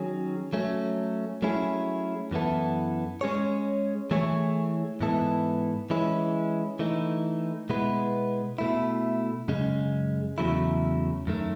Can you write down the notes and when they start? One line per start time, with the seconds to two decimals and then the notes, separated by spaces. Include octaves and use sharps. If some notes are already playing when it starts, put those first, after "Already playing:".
Already playing: D#3 F#3 C#4 G#4
0.53 F#3 A3 C#4
1.42 F#3 A3 C#4 E4 G#4
2.31 F#2 E3 B3 E4 A4
3.21 G#3 C#4 G#4 C#5
4.11 E3 A3 E4 G#4 C#5
5.01 G#2 E3 B3 E4 A4
5.90 E3 G#3 C#4 E4
6.79 E3 A3 D#4
7.69 B2 G#3 B3 E4 B4
8.58 B2 A3 E4
9.48 F#2 C#3 G#3
10.38 E2 C#3 F#3 A3 E4
11.27 F#2 D#3 A3